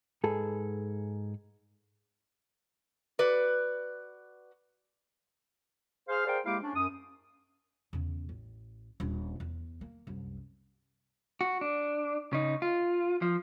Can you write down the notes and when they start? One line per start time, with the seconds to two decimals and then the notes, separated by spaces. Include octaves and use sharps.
0.24 G#2 G#4 A4 B4
3.19 F#4 B4 D5
6.09 G#4 C5 F5
6.27 G#4 A#4 C5 D5 F5 G5
6.46 G#3 A#3 E4 G4 F5 D6
6.63 C#4 D4
6.76 F#2 D#6
7.93 E2 C#3
8.29 A1
9.00 D#1 D4
9.40 E2
9.81 A#3
10.07 C2 F#2
11.41 F#4
11.61 D4
12.33 C#3 D#4
12.62 F4
13.22 F3